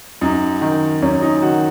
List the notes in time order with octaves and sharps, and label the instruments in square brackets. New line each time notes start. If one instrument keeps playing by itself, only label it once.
[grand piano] F#2 D#4
D#3
F#2 C#4
D#4
D#3 F#4